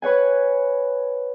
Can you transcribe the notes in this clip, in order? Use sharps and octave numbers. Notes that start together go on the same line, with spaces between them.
B4 C#5 F#5 G#5